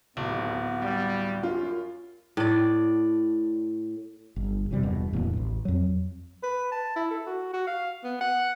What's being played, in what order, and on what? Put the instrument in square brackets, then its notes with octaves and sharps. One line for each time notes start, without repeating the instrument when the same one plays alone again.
[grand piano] D1 [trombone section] D#2 G#2 [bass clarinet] B3
[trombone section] G3
[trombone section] F#2 [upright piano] F4
[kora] A2 D5
[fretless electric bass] G1
E1 F#2 C3 G3
E1 G2 B2
D1 E2 B2 A#3
A1
F2 F#3
[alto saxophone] B4
A5
E4
A4
F#4
F#4
F5
B3
F#5